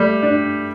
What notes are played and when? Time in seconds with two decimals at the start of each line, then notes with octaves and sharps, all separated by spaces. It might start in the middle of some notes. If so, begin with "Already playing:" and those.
Already playing: G3 A3
0.23 D4